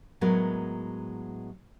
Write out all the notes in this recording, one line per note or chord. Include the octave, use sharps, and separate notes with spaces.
A2 F#3 G#3 B3 A#4